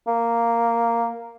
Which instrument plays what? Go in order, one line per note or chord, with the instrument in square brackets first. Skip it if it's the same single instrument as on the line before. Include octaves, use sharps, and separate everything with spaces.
[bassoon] A#3